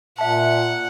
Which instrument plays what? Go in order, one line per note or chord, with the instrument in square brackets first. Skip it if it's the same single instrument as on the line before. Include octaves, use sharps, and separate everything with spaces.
[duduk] A#2 [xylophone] E5 A5 [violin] F#5